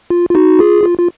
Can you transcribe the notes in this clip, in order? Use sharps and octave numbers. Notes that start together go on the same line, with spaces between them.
F4
F4
D#4 F#4
F4 G#4
F4
F4